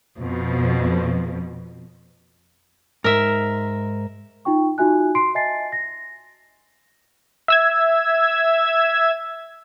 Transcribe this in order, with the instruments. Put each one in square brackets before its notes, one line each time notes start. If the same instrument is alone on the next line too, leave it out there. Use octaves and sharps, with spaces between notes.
[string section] F2 B2
[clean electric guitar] G#2 [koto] A#4 E5
[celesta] D#4 F4 G5 C#6
D#4 F4 F#4 E5 G#5 F#6
C6 C7 D7
D#5 E5 G#5 A5 A6 C7
A#6
[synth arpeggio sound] E5 E6 G#6